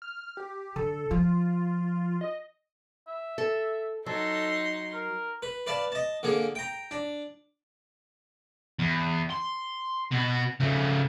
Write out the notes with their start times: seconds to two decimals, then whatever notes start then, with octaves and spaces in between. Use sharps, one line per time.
0.02 F6
0.37 G4
0.76 D3 A4
1.11 F3 F4
2.21 D#5
3.07 E5
3.38 A4
4.06 F#3 D#4 A4 C6
4.93 A#4
5.42 B4
5.67 B4 D5 F5 A5
5.92 D#5 A5
6.23 D3 A#3 G#4
6.55 G5 A#5
6.91 D4
8.79 E2
9.30 C6
10.11 B2 F#4
10.60 C#3 A3